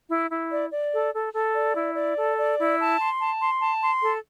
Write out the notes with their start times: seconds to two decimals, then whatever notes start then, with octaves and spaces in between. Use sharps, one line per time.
0.09 E4
0.30 E4
0.51 D5
0.71 D5
0.93 A4
1.13 A4
1.34 A4
1.55 D5
1.75 E4
1.95 D5
2.16 A4
2.37 D5
2.58 E4
2.78 A5
2.99 C6
3.20 A5
3.40 C6
3.60 A5
3.82 C6
4.02 A4